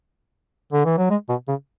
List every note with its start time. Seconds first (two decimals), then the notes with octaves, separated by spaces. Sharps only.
0.73 D3
0.85 E3
0.98 F#3
1.10 G#3
1.29 B2
1.48 C#3